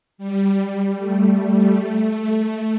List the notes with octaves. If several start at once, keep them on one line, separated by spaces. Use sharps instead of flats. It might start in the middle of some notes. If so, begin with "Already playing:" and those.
G3
A3
A3